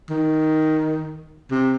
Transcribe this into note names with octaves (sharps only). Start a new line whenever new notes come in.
D#3
C3